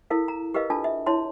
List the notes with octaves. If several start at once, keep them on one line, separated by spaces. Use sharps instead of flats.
E4 A4 A#4 F5
A#5
G4 A#4 B4 D#5 F5
D4 F4 A4 A5
E5
E4 C#5 A5 C6